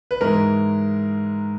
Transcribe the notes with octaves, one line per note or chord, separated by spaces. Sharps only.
B4
G#2 E3 G#3 A#4